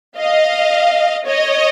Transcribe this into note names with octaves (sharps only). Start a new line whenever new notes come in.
D#5 F5
C#5 D#5